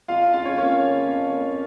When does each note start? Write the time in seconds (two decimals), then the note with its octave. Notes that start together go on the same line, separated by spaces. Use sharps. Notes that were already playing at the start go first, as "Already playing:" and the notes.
0.08 F2 F4 F5
0.33 C#3 F4 F5
0.45 C#4 C#5
0.58 A#3 C#4 C#5
0.83 C#3
1.07 F2
1.32 A#3